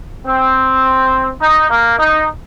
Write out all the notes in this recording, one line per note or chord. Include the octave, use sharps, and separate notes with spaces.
C4
D#4
A#3
D#4